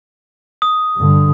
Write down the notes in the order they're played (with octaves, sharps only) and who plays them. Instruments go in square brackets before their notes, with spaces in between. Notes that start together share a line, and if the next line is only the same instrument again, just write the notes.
[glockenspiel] D#6
[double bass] G2 D3